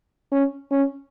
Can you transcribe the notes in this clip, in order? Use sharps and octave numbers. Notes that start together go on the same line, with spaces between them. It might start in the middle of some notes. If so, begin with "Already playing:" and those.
C#4
C#4